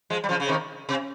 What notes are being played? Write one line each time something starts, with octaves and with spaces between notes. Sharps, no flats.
F3 G#3
G3
C#3 F3
C#3
C3 D#3
C3